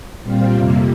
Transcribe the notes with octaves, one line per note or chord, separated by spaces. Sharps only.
A#2 G3 C4 F4
F2 C3 G3 A#3